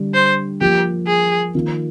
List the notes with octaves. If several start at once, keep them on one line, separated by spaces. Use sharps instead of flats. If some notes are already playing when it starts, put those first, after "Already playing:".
Already playing: D3 G3 D4
C5
F3 A#3 F4 G4
G#4
D#3 A#3 F4